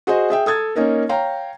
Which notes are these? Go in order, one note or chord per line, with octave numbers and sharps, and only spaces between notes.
F#4 G#4 C5 D#5
G#4 E5 G5
A4 D#6 G#6 A6
A#3 C#4 D#4 A#4
C#5 F5 G5 A#5